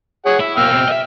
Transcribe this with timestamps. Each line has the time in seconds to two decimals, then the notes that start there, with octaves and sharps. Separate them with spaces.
0.26 G#4 C#5 F#5
0.40 E4 E5
0.57 B2 A#3 G5 E6 F6
0.71 B2 C4
0.88 D#5 E5